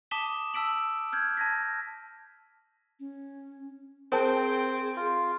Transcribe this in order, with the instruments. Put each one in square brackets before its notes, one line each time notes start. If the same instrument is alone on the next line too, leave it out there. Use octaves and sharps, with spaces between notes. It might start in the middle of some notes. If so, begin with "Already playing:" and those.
[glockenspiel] A5 D6 D#6 B6 E7 G7
A5 E6 B6 D7 F#7
F6 G6 G#6
A5 G#6 A#6 B6
[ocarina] C#4
[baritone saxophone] C4 [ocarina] G#4 [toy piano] A#4 C5 A5 [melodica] G5
[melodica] F4